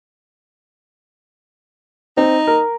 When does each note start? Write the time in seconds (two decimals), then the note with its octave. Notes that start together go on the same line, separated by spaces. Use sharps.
2.17 C4 D#4
2.47 A#4